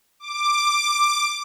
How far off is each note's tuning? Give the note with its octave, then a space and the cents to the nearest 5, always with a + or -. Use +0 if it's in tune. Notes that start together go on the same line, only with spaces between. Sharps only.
D6 +10